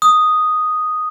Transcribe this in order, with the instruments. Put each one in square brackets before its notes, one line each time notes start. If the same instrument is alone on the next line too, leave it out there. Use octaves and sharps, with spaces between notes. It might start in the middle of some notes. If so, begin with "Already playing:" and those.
[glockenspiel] D#6